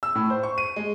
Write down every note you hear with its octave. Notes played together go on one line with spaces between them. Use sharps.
E6
A2
C5
C#6
D#7
G#3